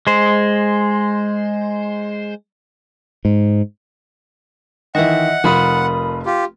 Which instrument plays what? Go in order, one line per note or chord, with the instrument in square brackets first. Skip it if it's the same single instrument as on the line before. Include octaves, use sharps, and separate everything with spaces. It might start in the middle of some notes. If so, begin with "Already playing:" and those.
[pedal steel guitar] G#3 C5
[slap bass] G#2
[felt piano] D#3 E3 [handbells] D#5 E5 [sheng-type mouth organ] F#5
[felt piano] F1 F3 F4 [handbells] A#4 B5 D#6
[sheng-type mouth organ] F4 G4